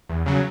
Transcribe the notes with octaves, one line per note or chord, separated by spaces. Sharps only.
E2
C#3 F#3